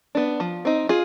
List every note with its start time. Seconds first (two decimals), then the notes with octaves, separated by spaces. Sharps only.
0.15 B3 D4
0.40 F3
0.65 C4 D#4
0.89 F4 G#4